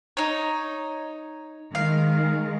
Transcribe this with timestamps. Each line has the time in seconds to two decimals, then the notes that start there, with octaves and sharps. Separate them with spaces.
0.17 D#4 C#5
1.75 D#3 G#3 F5